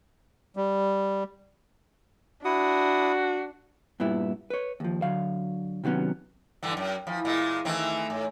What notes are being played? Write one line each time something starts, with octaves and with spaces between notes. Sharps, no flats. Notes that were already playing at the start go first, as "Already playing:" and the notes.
G3
D4 E4 F#4 D#6
G2 A#2 B3 E4
B4 C#5
D#2 F3
D3 F#3 F5
C3 D#3 F#3 B3 C#4
G2 D3 E3 G5
F#2
E3 F3 F5 B5
A#2 G#3
D#3 E3 A3 C4 E5 G#5
A2